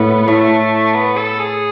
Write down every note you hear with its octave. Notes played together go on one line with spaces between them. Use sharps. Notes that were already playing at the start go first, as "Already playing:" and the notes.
Already playing: A2 B3
A2 A3
B3
A4
G#4